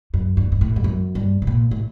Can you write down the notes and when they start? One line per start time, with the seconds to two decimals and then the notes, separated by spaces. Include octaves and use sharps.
0.14 F#2
0.37 G2
0.52 G2
0.61 A2
0.76 G2
0.84 F#2
1.15 G2
1.42 C3
1.47 A#2
1.71 A2